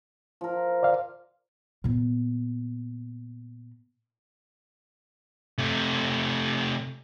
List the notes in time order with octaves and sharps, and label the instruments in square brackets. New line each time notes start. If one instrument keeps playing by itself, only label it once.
[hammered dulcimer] F3 A#4
[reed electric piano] D5 F5
[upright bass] A#2 B3
[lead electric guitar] C3 A3